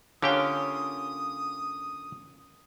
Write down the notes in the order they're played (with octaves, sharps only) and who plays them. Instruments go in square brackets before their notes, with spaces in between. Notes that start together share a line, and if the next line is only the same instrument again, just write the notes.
[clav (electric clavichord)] D3 G4 G5 [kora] A#3 C#4 F4 [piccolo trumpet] D#6